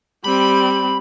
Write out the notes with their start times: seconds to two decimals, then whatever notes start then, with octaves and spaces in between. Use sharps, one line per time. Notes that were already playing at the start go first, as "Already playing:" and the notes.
0.24 G3 C4 B5